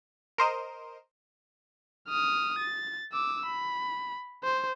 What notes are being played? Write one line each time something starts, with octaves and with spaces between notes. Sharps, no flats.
A#4 C5 D#5
D#6 F6
A6
D6 E6
B5
C5